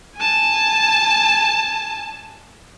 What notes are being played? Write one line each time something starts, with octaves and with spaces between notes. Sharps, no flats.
G#5 A5